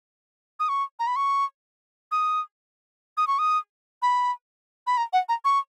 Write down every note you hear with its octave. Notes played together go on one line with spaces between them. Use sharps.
D#6
C#6
A#5
B5
C#6
D#6
D#6
C#6
D#6
B5
B5
A#5
F#5
A#5
C#6